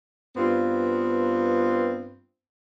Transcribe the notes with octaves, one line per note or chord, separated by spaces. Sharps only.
G2 B3 C4 F4